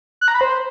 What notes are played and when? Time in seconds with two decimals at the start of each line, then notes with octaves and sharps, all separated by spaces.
0.21 F#6
0.28 A#5
0.34 B5
0.41 C5